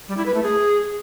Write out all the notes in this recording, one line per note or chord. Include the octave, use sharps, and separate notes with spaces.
G3
E4
B4
A3
G#4